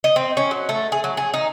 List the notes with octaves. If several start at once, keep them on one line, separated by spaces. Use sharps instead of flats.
D#5
C4
C#4
F#3
A3
G#4
F#3
G#4
D#4